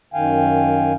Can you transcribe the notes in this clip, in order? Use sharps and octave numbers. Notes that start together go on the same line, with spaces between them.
F#2 D#3 F5 G5 G#5